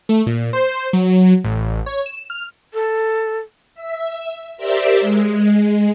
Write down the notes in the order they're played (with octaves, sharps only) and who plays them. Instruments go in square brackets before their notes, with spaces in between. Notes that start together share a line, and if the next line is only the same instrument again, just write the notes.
[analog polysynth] A3
A#2
C5
F#3
A1
C#5
E7
F6
[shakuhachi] A4
[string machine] E5
G4 A#4 C5 D5 E5 E6
G#3